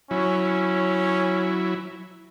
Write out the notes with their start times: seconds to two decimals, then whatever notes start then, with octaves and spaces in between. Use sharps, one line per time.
0.11 F#3 C#4 E4